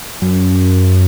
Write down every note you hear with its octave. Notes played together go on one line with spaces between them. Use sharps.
F#2